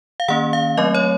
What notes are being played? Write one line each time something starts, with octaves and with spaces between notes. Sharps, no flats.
F5
D#3 A#3 C#4 F#5
F5
F#3 A3 C4 D#5
C#5